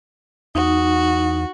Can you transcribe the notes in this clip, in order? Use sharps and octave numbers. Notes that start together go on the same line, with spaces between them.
E2 D#4 F#4